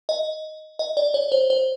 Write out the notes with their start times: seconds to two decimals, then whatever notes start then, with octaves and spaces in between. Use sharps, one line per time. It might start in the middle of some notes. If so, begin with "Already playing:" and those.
0.09 D#5
0.79 D#5
0.97 D5
1.14 C#5
1.32 C5
1.50 C5